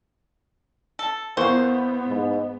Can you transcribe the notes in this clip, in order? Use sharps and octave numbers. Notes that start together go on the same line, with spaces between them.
A4
E2 A#3 B3 C5 C#6
G#2